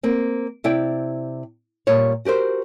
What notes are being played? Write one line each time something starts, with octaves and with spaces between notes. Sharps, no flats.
A#3 C4
C3 E4 D5 G5
A#2 G3 C#5
F#4 G4 A#4 C5